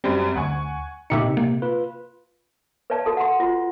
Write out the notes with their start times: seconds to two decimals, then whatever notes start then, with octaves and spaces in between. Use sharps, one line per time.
0.04 F#2 G3 C4
0.36 D2 F#5 G#5 C#6
1.10 A#2 C#3 D#4 G4 E5 C#7
1.22 C3
1.37 A#3
1.62 F4 B4
2.90 B4 C#5 D5 F5 A5 A#5
3.05 F#4 A4 A5
3.17 F#5 A#5 C6
3.40 F4 F#4